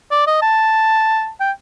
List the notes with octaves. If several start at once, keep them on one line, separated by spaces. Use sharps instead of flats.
D5
D#5
A5
G5